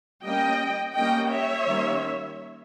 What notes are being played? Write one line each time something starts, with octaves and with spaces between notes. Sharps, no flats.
G3 A#3 C#4 D#5 G5
G3 A#3 C#4 D#5 G5
C#5 E5
D#3 G3 A#3 C#4